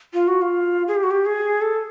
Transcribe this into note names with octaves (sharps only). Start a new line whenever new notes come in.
F4
F#4
F4
G#4
G4
F#4
G4
G#4
A4